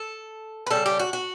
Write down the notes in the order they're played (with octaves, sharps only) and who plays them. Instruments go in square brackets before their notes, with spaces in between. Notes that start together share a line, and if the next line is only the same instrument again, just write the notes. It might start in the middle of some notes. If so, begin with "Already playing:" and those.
Already playing: [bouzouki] A4
B4
C#3 G3 A4
G4
F#4
F#4